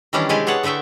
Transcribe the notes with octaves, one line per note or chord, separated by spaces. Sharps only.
D#3 E3 G3 C#4 D4 E4
C3 G#3 D4 E4 G4 G#5
B3 G#4 C#5 F#5 A5
D3 A3 B3 E5 G5